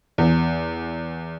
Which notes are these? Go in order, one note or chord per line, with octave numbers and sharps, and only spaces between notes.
E2